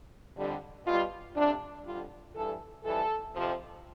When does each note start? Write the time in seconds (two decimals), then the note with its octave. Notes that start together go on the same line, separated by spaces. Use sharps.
0.36 F2 D3 G3
0.86 B2 G3 F4
1.36 F2 C3 G3 D4
1.85 F2 D3 G3 F4
2.34 G2 E3 G3 A4
2.84 F2 E3 G3 A4
3.34 F2 C3 F3